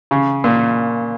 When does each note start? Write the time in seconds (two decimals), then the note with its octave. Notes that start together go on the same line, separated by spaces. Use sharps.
0.11 C#3
0.44 A#2